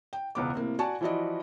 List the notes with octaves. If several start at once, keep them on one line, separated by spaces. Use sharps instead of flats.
G5
E1 C#2 B3 D6
A2 C3 A#3
F#4 D5 F#5 G#5 A5 C#6
E3 F3 E4 F#4 D5 D#5